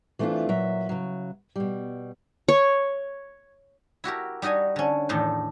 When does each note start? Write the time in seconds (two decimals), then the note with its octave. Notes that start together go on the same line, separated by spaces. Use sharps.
0.19 E3 A3 B3 C4 D4 F4
0.49 A#2 F#3 E5
0.89 C#3 F#3
1.56 B2 G3
2.48 C#5
4.04 E4 F#4 G4 A#4
4.42 G3 D#4 F#4 D#5 G#5
4.76 D3 C#4
5.09 E2 A2 D#3 A3 D4 G5